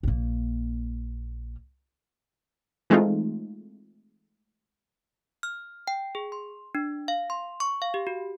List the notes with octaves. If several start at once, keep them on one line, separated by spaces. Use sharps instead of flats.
A#1 A#3
E3 G#3 A3 C4 D#4 F4
F6
G5
G#4
C6
D4
F5
C6
C#6
F5
G4
F#4